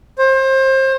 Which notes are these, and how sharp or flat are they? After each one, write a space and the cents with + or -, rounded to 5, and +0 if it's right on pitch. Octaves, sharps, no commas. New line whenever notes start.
C5 +30